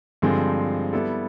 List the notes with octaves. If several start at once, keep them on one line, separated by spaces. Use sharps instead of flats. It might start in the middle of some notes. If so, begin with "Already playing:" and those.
G2 D3 F3 G#3 C4
G3 B3 E4 A4